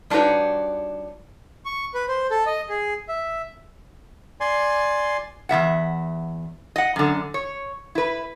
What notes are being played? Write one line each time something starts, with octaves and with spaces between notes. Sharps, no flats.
G3 D4 D#4 F#4 B4 C#5
C#6
B4
C5
A4
D#5
G#4
E5
D5 G#5 C6
E2 G3 E5 F#5
D#5 F#5
F#2 D3
C#5
E4 B4